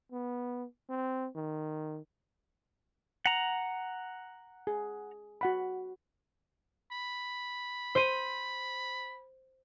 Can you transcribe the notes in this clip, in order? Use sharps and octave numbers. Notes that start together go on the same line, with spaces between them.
B3
C4
D#3
F#5 A#5
G#4
F#4 F#5 B5
B5
C5 D#7